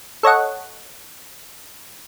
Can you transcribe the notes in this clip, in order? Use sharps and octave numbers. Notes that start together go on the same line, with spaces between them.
A4 C#5 D#5 F#5